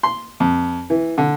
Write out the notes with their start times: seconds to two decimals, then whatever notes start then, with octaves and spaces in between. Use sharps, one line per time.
0.03 C6
0.40 F2
0.90 E3
1.18 D3